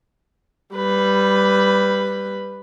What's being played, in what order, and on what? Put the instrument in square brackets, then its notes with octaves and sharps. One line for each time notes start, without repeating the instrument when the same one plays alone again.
[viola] G3 B4